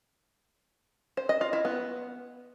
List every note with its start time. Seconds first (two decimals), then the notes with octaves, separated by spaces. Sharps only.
1.17 C5
1.29 D#5
1.41 F4
1.53 E4
1.65 B3